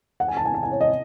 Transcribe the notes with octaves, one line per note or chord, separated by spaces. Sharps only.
F#5
G#5
A5
G#5
A5
G#5
C#5
D#5